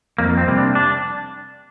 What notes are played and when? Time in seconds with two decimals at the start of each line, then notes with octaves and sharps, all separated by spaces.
0.18 F2 A#3
0.37 C4
0.48 C3 G3 A#3
0.58 D4
0.75 D4